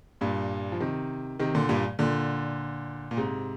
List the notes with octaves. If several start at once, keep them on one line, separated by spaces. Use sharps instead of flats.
G2 A#2
F3
C3 D#3
C3 D#3
A#2 D3
G2 A#2
A#2 D3
A#2
G#2 C3